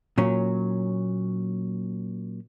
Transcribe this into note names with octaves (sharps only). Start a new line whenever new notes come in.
A#2 F#3 C#4